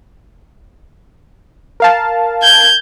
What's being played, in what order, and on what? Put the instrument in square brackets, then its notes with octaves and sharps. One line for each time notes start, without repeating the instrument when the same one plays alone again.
[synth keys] A#4 F5 A5
[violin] G6 G#6